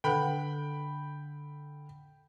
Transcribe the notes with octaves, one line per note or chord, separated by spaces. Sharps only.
D3 A4 B4 F#5 G5 B5